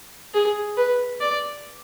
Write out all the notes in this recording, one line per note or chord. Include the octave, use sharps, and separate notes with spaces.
G#4
B4
D5